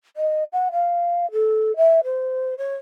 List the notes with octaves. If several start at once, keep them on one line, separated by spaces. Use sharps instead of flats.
D#5
F#5
F5
A4
E5
C5
C#5